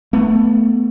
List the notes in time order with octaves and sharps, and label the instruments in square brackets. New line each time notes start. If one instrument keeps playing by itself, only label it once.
[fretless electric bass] A3 B3